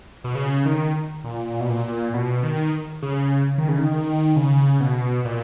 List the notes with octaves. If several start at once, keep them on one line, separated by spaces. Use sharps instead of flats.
B2
C#3
D#3
A#2
B2
A#2
B2
D#3
C#3
D#3
C#3
D#3
D#3
C#3
B2
A#2